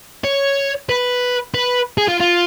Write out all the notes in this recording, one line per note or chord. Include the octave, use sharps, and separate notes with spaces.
C#5
B4
B4
G#4
F4
F4